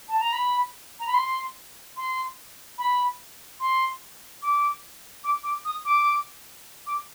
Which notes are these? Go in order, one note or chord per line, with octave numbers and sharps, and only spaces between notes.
A5
A#5
B5
A#5
B5
C6
C6
B5
C6
D6
D6
D6
D#6
D6
D6